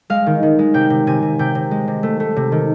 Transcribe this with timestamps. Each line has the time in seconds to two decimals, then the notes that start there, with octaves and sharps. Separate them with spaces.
0.10 G#3 F5
0.27 D#3
0.43 D#3
0.59 G#3
0.74 C3 G5
0.90 C3
1.07 C3 G#5
1.22 C3
1.39 C3 G5
1.55 C3
1.71 G#3
1.88 C3
2.03 A3
2.20 A3
2.36 C3
2.52 D#3